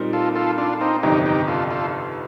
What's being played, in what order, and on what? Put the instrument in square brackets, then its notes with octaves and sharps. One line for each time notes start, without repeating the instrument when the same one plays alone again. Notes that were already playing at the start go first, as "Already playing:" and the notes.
Already playing: [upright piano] A#2 G3 C4 D#4 A#4
[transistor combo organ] F4 A4
F4 A4
D4 F4
C4 D#4
[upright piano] G1 F2 C3 D#3 [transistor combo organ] D#4 G4
[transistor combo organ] D#4 G4
F4 A4
F4 A4